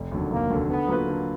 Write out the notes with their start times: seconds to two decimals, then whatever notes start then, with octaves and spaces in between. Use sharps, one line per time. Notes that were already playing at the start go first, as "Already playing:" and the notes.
Already playing: F1
0.11 D#2 D3 F#3
0.31 F1 A#3
0.50 D#2 D3 F#3
0.69 D3 B3
0.88 F#3 A#3 F4 B4
1.08 D3